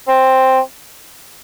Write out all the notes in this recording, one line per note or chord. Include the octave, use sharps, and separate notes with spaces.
C4